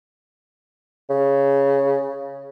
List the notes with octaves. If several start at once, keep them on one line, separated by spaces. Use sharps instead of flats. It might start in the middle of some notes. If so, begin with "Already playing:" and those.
C#3